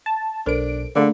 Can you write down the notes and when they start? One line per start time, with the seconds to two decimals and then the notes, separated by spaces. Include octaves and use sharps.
0.06 A5
0.46 B1 D4 A4 A#4 C5 D7
0.96 D3 A3 A#3 D4 G#4